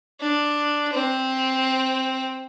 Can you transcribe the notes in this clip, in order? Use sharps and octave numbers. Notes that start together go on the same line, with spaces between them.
D4
C4